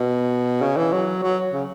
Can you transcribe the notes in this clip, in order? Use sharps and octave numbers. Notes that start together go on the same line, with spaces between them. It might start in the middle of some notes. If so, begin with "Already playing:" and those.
Already playing: B2
C#3
E3
F#3
F#3
C#3